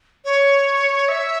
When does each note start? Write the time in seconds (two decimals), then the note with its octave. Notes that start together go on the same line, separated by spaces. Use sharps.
0.25 C#5
1.08 E5